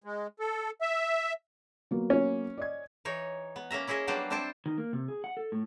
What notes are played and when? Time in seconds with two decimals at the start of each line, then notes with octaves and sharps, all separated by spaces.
0.04 G#3
0.40 A4
0.81 E5
1.91 F#3 A#3 B3
2.10 C#4
2.57 D5 D#5 G#6
3.05 E3 D#4 C#5
3.56 B3
3.71 A#3 C#4 E5 A#5
3.87 C#4 E4 G#4 D#5 E5
4.07 F#3 G3 A#3 B3 D4 C5
4.30 C4 D4 E4 C5 G5 A5
4.66 D#3
4.78 A#3
4.93 C3
5.08 G#4
5.24 F#5
5.37 A4
5.52 A2